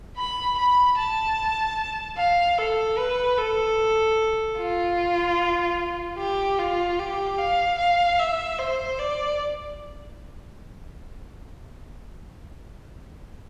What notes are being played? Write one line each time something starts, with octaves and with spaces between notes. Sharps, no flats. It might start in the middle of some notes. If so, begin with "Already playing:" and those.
B5
B5
A5
F5
A4
B4
A4
F4
G4
F4
G4
F5
F5
E5
C5
D5